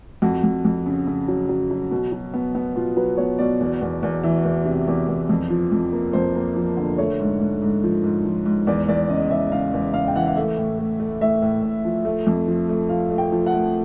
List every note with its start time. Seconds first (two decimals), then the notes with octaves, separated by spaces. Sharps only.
0.22 F2 F#4
0.43 F2
0.65 F2
0.86 C#3
1.07 C#3
1.28 F#3
1.49 F#3
1.71 F#3
1.91 B2
2.12 F#3
2.34 B3
2.55 B3
2.76 B2 F4
2.96 F#3 B4
3.17 B3 C#5
3.39 B2 D5
3.61 E2
3.81 E2
4.03 E2
4.24 E3
4.44 E2
4.65 C3
4.88 E2
5.08 E2
5.29 F2
5.50 F3
5.72 F2
5.93 A#3
6.13 F2 C5
6.35 A#3
6.56 F3
6.77 D3
6.98 A3 C#5
7.20 G#2
7.40 G#2
7.62 G#2
7.83 F3
8.04 G#2
8.24 F3
8.46 G#2
8.67 E2 D5
8.88 E2 D5
9.09 C#3 D#5
9.30 E2 E5
9.52 C#3 F5
9.73 E2
9.94 C#3 F5
10.08 G5
10.15 E3 F#5
10.27 F5
10.36 A3 E5
10.57 A2
10.79 A3
11.00 A3
11.21 A2 E5
11.42 A2
11.63 A2
11.84 F3
12.05 A3
12.27 F2
12.48 F3
12.69 A3
12.89 F3 F5
13.10 A3
13.18 G5
13.32 F3
13.46 F#5
13.53 A3